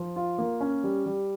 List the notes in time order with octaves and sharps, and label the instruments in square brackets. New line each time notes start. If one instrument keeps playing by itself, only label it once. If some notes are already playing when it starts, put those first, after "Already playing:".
Already playing: [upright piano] F3
F4
A#3
C#4
G3
G3